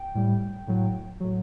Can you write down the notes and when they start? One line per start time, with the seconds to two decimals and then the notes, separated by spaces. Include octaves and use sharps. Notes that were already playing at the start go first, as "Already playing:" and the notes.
Already playing: G5
0.15 A2 G3
0.67 A2 F#3
1.20 A2 F#3